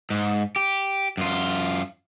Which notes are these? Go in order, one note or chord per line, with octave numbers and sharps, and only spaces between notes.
G#2
G4
F#2 F4